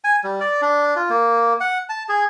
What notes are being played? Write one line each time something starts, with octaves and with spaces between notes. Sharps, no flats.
G#5
G3
D5
D4
F4
A#3
F#5
A5
G#4